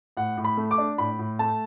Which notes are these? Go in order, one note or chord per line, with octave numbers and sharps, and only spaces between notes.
A2 F#5
A2
B5
A3
D6
D4
A2 B5
A2
A3 A5